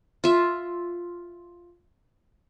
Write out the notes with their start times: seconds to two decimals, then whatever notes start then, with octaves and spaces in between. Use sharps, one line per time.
0.24 F4 E5